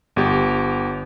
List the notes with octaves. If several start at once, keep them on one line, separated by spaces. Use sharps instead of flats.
G1 G4